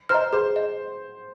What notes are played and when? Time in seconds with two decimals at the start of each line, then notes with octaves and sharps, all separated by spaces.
0.09 C5 D#5 A#5 F6
0.33 G#4 C5
0.56 D#5